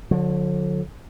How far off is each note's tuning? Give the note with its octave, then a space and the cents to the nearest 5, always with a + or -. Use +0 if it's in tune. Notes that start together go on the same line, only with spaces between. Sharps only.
D3 +0 F#3 -45